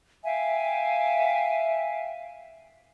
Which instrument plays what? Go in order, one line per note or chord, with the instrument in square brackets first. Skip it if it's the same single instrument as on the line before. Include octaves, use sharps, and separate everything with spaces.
[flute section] E5 F5 G5 G#5